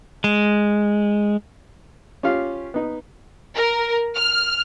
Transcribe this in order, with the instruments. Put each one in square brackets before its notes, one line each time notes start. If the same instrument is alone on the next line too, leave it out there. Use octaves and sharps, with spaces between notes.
[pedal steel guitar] G#3
[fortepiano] C#4 F4 G4 F5
B3 D#4
[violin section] A#4
F6